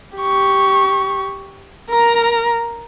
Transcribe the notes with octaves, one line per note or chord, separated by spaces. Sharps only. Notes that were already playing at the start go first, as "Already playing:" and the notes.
G4 C#6
A#4 A#5